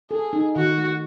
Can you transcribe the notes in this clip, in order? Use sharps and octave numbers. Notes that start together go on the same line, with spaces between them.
G#4 A4
D#4
D#3 F#4
A3